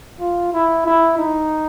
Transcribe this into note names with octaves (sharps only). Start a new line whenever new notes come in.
F4
E4
E4
D#4